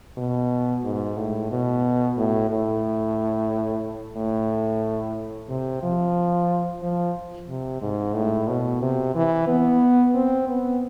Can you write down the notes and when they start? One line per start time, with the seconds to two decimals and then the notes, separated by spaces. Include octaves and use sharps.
0.18 B2
0.84 G#2
1.17 A2
1.51 B2
2.17 A2
2.51 A2
4.17 A2
5.49 C3
5.83 F3
6.82 F3
7.49 C3
7.82 G#2
8.15 A2
8.48 B2
8.82 C3
9.15 E3
9.48 B3
10.14 C4
10.48 B3